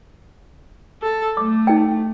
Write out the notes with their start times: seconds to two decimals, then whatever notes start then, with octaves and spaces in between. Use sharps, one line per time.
1.02 A4
1.37 A3 D6
1.67 D#4 G5